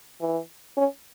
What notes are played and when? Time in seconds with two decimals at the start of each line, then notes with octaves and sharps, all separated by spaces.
0.21 E3
0.78 C#4